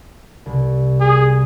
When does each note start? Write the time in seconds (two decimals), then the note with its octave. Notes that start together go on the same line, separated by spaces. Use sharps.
0.46 C2
1.00 G#4